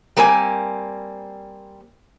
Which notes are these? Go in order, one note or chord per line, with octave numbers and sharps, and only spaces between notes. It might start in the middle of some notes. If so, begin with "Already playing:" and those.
G3 A#3 C4 B4 G#5